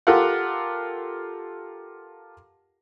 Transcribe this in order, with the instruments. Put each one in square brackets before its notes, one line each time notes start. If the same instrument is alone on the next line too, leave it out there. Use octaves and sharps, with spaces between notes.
[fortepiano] F4 G4 A4 A#4 F5 F#5